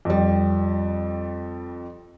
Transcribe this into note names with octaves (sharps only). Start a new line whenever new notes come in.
F2 G3